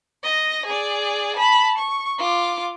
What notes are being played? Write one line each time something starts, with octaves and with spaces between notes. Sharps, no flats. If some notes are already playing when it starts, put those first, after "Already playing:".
D#5 A#6
G#4 D5
A5 B5
C#6
F4 D6